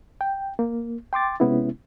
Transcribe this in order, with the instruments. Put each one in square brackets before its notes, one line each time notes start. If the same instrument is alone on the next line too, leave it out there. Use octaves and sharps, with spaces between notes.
[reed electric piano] G5
A#3
G5 C6 D6 A6
C3 G#3 B3 C#4 E4